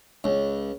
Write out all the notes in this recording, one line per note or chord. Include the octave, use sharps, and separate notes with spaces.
C#2